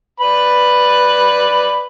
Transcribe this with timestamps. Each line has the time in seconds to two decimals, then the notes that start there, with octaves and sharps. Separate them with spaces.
0.20 B4 D5 B5